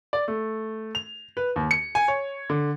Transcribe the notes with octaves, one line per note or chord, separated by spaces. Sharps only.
D5
A3
F7
B4
D#2
C#7
G#5
C#5
D3